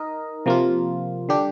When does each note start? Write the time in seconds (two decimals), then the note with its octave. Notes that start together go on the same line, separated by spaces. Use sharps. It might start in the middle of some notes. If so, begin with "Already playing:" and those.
Already playing: D#4 A#4 D#5
0.46 C3 F3 A#3 F4
1.29 D3 G3 D4 G4